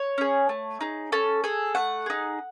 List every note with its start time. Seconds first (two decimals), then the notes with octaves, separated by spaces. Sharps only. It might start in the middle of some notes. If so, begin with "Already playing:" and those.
Already playing: C#5
0.18 C#4 G#4
0.49 A3
0.81 D#4 G#4
1.12 C#4 A4
1.44 G#4 A4
1.75 A3 F#5
2.06 D#4 G#4